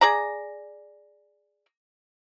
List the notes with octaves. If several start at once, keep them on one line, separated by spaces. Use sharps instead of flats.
G#4 D5 A#5